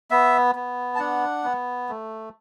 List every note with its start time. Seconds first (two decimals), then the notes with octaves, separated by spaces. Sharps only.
0.11 B3 E5
0.55 B3
0.95 A5
0.99 D4 F#5
1.44 B3
1.89 A3